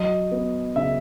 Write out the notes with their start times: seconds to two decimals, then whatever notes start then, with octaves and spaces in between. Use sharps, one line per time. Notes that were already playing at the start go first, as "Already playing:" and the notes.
Already playing: F#3 D#5
0.31 B3
0.76 C#3 E5